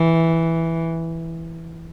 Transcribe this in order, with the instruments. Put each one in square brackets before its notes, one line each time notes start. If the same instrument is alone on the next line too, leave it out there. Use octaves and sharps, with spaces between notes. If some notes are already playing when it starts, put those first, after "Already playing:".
Already playing: [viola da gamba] E3